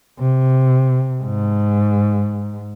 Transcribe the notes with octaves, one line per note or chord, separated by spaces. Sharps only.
C3
G#2